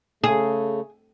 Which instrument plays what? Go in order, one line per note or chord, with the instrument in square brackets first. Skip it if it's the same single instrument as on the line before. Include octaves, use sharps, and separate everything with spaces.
[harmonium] C#3 A3 [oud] G#4